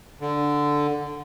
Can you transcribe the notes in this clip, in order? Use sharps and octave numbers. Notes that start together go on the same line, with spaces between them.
D3